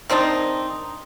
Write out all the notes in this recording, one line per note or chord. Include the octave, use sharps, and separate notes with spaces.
D#3 C4 D4 D#4